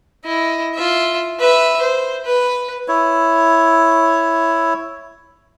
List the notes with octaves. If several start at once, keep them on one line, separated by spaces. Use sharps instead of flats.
E4 D#5
F4 E5
B4 E5
C5
B4
E4 C#5